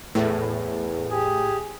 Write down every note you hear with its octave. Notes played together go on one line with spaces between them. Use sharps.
E2 A2
G4 G#4